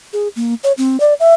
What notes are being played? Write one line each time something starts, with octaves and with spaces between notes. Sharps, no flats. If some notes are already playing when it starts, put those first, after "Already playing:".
G#4
A#3
C#5
C4
D5
E5